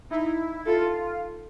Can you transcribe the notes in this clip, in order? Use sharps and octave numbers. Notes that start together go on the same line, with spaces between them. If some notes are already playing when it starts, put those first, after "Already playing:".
D#4 E4
F4 A4